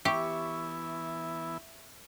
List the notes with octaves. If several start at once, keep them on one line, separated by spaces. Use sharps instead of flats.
E3 B3 E4 G4 E5 C#6